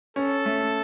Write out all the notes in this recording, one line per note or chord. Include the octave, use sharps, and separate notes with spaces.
C#4 A4
A3